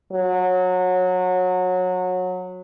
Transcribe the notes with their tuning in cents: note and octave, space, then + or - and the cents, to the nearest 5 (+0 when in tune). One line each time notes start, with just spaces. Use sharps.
F#3 -20